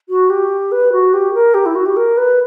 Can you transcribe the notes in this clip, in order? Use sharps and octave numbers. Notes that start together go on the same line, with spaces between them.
F#4
G4
B4
F#4
G4
A#4
G4
E4
F#4
G4
A#4
B4